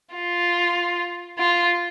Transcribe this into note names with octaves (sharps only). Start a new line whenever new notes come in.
F4
F4